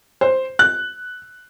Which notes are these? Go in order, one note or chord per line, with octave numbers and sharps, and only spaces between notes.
C5
F#6